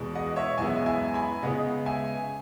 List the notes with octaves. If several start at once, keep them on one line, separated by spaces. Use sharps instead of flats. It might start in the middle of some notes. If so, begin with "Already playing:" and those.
Already playing: E2 B2 G#3 B3
D#5 F#5
C#5 E5
F#2 E3 G#3 B3 E5 G#5
E5 G#5
G#5 B5
C#3 G#3 B3 D#5 F#5
E5 G#5